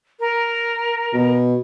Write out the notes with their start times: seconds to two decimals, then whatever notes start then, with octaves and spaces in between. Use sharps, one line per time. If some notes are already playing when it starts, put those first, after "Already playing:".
0.20 A#4
1.14 B2